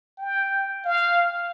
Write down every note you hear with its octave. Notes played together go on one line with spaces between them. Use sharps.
G5
F5